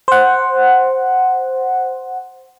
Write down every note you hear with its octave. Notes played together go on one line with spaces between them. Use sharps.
C5 F#5